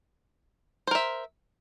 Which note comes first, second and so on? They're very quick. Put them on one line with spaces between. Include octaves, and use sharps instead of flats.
C5 A#4 E5